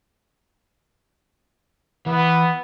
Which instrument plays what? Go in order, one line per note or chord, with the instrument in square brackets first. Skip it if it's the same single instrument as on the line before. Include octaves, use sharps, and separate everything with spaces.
[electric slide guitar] E3 [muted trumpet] B3